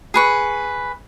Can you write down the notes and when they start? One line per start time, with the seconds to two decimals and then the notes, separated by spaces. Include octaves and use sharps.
0.14 G#4 B4 C#6